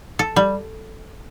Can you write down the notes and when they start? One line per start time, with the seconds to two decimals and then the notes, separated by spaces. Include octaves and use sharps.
0.19 A4
0.36 G3